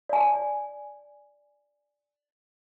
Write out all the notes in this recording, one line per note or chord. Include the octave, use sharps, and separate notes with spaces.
D5 G#5